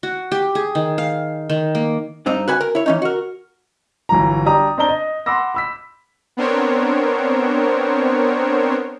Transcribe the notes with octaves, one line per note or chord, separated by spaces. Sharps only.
F#4
G4
G#4
D#3
F5
D#3
A#3
G2 C4 D#4
F#4 B4 G#5
A#4
E4 C#5
E3 C#4 D#4
F#4 A#4
G1 E3 F#3 A#5
G3 D4 G4 A#5 D#6
C4 D4 A#5 G7
D#5
F#5 B5 C6 D6 E6 A#6
B5 E6 B6
B3 C4 D4 A#4 C5 C#5